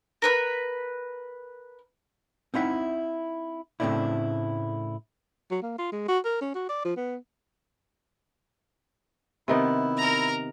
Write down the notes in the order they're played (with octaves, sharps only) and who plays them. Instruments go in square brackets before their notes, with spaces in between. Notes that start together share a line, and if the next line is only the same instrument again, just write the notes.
[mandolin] A#4 B4 B5
[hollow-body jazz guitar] C4 D#4 E4 E5 F#5
A2 C#3 A3 C4 D4 E4
[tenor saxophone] F#3
A#3
F4
G#3
F#4
A#4
C#4
F#4
D5
F3
B3
[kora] C3 D#3 B3 [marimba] C4 [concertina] E4
[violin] A#4 A#5